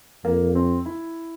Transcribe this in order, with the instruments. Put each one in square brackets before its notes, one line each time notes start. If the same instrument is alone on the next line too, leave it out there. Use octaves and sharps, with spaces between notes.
[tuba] F2 [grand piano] A#3
[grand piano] C4
E4